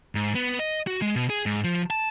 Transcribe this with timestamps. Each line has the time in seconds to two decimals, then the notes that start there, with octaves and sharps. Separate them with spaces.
0.15 G#2
0.35 B3
0.59 D#5
0.87 F#4
1.02 G#3
1.16 B2
1.30 G#4
1.46 G#2
1.64 F3
1.90 A5